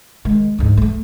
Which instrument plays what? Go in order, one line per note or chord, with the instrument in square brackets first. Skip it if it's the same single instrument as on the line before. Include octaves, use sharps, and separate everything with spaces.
[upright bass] D#3 G#3
D2 G#2
G#3 A3